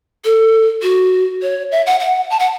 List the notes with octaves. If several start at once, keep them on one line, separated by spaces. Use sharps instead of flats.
A4
F#4
C#5
E5
F#5
F#5
A5
F#5